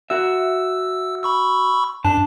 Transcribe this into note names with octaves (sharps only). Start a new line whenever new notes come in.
F#4 E5 E6
B5 C#6 E6
F#2 D4 A5